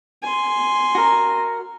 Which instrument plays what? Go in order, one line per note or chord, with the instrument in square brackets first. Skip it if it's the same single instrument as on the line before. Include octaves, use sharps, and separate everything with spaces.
[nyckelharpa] G#5 C6
[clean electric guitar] F#4 A#4